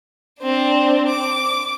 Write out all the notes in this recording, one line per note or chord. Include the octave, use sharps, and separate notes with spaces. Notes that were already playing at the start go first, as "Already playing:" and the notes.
C4 D4
D6